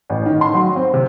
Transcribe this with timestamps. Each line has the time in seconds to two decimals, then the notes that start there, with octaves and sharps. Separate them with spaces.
0.10 A1
0.26 D#3
0.41 C6
0.54 F#3
0.76 C4
0.94 C3